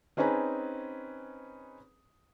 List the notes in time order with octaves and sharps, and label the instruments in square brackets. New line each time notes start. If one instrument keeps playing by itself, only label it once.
[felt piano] C4 C#4 D#4 G#4 B4 A#5